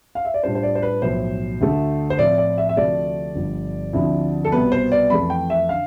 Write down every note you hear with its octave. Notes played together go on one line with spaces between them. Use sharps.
F5
E5
D5
A2 G3 D4 F4 C5
C5
D5
C5
B4
B1 A2 F3 C5
D2 D3 A3
C5
A2 F3 C4 F4 D5
D5
E5
E5
D2 C3 F3 A3 D5
G1 G2 D3 F3
D2 D3 F3 C4 E4
A4
C2 B2 B3 B4
C5
D5
F2 E3 A3 B5
G5
E5
D3 F5